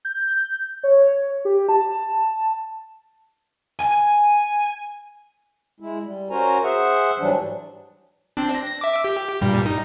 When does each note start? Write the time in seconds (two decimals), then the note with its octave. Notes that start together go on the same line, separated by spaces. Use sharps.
0.05 G6
0.83 C#5
1.45 G4
1.69 A5
3.79 G#5
5.80 G#3 E4
6.04 G3
6.30 C#4 F#4 A#4 C5 G#5 A#5
6.64 G#4 C5 E5 F#5
7.19 G#2 E3 F#3 G3 D4
8.37 C4 D4
8.55 A#6
8.81 E5 D6
9.04 G4
9.41 G2 A#2 G3
9.66 D#4